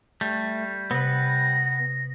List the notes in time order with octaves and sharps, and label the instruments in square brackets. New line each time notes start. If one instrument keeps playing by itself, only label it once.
[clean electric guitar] G3 [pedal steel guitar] A3
[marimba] C3 [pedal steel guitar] B3 B4 [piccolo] A#6